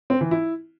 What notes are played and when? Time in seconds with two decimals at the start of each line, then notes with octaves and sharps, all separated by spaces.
0.10 C4
0.21 E3
0.31 E4